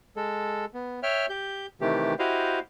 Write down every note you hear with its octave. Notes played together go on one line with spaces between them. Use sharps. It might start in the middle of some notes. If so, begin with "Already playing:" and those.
G#3 A4
B3
C#5 E5 G5 F6
G4 G6
C3 D#3 E3 A3 G4
E4 F#4 G4 C5 D#5 F5